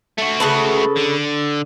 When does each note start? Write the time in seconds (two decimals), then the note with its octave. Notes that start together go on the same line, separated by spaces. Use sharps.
0.18 A3 F#4
0.40 C#3 A4 B4
0.97 D3